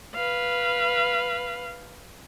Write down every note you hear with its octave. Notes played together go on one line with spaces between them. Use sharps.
B4 F5